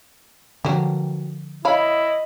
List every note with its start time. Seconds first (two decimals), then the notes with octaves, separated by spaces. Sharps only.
0.65 D3 F3 F#3 G4
1.65 E4 C#5 D#5 F5 B5